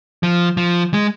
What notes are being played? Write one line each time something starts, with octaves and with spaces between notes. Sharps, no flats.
F3
F3
G#3